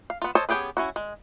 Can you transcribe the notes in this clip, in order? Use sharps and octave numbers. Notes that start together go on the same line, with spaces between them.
F5
B3 F4
A4 C5 C#5 D#5 A5
B3 C#4 G4 G#4 B4
C#4 E4 F#4
G#3